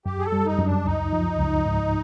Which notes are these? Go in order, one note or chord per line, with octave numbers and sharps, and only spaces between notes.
F#2 G4
G#4
A4
G3
D#4
F#2
D4
C#2 D#4
F3
C#2
G#2